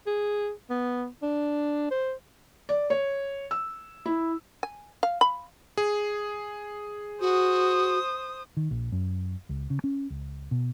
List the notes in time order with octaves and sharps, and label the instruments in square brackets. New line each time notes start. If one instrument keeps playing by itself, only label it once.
[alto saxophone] G#4
B3
D4
C5
[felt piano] D5
C#5
E6
E4
[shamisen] G#5
F5
B5
[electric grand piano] G#4
[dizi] F#4 [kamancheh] C5 D#6
[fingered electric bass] D#3
A#1
F#2
C#2
C#3
C#4
C#2
B2